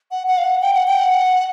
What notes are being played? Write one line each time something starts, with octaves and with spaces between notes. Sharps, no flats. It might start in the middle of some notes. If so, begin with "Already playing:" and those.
F#5
F#5
F5
F#5
G5
F#5
G5
F#5